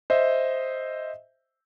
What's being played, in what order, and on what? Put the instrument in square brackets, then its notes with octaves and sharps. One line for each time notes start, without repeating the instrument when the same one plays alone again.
[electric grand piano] C5 D#5 E5